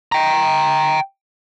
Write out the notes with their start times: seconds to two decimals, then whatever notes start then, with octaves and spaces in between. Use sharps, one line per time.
0.12 G5 A#5